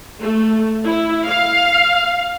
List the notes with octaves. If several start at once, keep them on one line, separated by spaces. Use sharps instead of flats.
A3
E4
F5